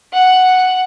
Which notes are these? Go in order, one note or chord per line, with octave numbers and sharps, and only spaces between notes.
F#5